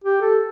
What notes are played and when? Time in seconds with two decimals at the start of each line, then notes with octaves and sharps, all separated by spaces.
0.04 G4
0.21 A4